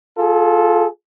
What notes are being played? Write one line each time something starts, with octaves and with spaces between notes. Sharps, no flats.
F4 G#4 A4